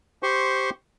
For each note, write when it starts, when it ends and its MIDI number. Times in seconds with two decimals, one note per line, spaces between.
0.23 0.70 67
0.23 0.70 72
0.23 0.70 84
0.23 0.70 85